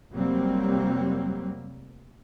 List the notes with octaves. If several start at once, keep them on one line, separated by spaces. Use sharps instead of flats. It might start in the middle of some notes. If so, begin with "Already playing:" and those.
F1 F#3 G3 A#3 C4